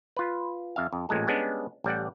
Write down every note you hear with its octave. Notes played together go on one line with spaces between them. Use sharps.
F4 B4
F2 E5 F5
F2
A1 A#2 G#3 A4
G3 G#3 B3 C#4 D4
A1 G3 D5 F#5